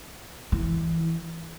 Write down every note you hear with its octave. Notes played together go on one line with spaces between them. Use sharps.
E3